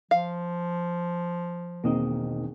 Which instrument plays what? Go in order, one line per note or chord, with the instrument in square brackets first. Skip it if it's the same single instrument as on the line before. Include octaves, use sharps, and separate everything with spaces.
[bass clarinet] F3 [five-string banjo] F5
[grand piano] E1 D#3 D#6 [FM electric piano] A#3 C4 D#4